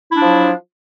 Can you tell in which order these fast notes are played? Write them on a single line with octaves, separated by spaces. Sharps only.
E4 D4 F#3 F3